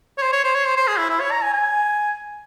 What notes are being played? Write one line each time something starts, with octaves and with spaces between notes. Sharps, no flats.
C#5
C5
C#5
C5
C#5
C5
C5
G#4
E4
E4
C#5
A#5
G#5
G#5